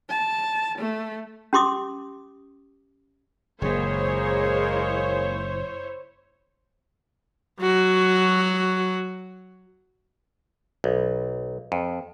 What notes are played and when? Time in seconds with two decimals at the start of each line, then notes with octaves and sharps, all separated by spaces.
0.10 A5
0.78 A3
1.53 C#4 G4 C6 D6 D#6
3.62 F#1 A#2 G#3 A#3 E4 G#4 C5 C#5
7.61 F#3 F#4
10.84 B1
11.72 F2